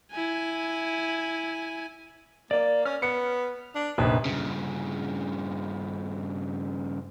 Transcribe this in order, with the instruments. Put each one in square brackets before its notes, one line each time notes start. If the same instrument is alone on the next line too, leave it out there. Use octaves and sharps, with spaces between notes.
[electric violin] E4 G#5
[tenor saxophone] A#3 [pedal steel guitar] D5
[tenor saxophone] C#4 [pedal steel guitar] F6
[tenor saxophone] B3 [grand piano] C#7
[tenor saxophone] D4
[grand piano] F1 A#1 [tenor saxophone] B4
[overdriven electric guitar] G2 C#3